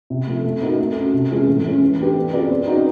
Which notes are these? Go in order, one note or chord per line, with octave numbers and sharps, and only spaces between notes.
C3
F3 A3
A3
C4 D#4 F#4 A#4
A3
C#4 F#4
C3
E3 G#3 C#4 F4
A2
E3 G#3 C#4
E3
A3 D4 G4 B4
C4
F4 G#4 B4 D5
C4
D#4 F#4 B4 D5